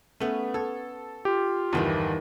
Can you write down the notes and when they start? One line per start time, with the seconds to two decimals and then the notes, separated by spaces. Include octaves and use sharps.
0.20 A3 B3 C#4
0.54 A4 C#5
1.25 F4 G4
1.73 G1 E2 D#3 E3 G3